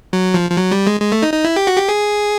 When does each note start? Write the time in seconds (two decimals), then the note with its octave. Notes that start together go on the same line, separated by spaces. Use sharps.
0.13 F#3
0.34 F3
0.51 F3
0.57 F#3
0.71 G3
0.87 G#3
1.01 G#3
1.12 A3
1.23 D#4
1.33 D#4
1.44 E4
1.56 G4
1.67 F#4
1.78 G4
1.89 G#4